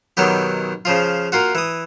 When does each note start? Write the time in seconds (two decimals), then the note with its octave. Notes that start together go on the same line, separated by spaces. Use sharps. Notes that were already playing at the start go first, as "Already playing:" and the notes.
0.17 B1 D#3 F#3 B3 G4
0.85 C#3 F3 F4
1.32 A#3 F4 F#4
1.55 E3 D#6